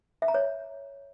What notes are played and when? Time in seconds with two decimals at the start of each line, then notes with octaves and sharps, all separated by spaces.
0.22 E5
0.28 A#5
0.34 C#5